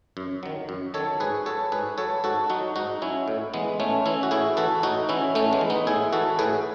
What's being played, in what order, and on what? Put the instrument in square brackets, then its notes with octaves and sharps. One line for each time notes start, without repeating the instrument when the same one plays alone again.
[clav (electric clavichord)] F#2
D#3 F#3
F#2
D#3 F#3 A4 C#5
G#2 G#4 B4
F#3 A4 C#5
G#2 G#4 B4
F#3 A4 C#5
G#2 F#4 A4
F#3 D#4 F#4
G#2 D#4 F#4
F#3 C#4 E4
A2
E3 G#3 B3
A2 A3 C#4
E3 C#4 E4
F#4
A2 E4 G#4
E3 F#4 A4
A2 D#4 F#4
E3 C#4 E4
A2 A3 C#4
G#3 B3
E3
B3 D#4
A2 E4 G#4
E3 F#4 A4
A2 G#4 B4